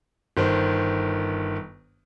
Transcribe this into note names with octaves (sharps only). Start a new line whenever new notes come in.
G1 D#3 C5